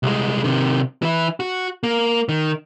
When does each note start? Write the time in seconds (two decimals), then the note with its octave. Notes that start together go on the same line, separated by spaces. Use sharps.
0.03 C2 G#3
0.44 C3 D#3
1.02 E3 E4
1.40 F#4
1.83 A#3
2.29 D#3